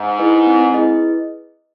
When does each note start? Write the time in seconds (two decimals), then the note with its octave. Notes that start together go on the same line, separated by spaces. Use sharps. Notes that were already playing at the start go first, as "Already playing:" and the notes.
Already playing: G#2
0.19 E4 G#4 B4 D#5
0.47 C4
0.74 E4 G#4 B4 D#5